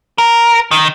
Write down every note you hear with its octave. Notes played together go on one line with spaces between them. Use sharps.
A#4
D#3